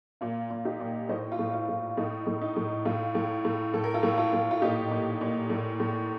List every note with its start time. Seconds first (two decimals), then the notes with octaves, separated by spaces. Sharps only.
0.21 A#2 F4
0.50 A#2
0.65 D#4 G4
0.80 A#2
1.09 A2 C5 D#5
1.32 F4
1.39 A2
1.54 F4
1.68 A2
1.97 A2 D#4
2.27 A2
2.42 D#4
2.56 A2
2.85 A2 F4
3.15 A2
3.45 A2
3.74 A2 A4
3.84 A#4
3.94 F4 A4
4.03 A2
4.18 F4 A4
4.33 A2
4.51 F4
4.62 A#2 D#4 G4
4.91 A#2
5.21 A#2
5.50 A2
5.80 A2